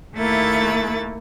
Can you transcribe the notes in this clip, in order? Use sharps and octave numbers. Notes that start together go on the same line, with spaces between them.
D#2 A3 A#3 E4 A6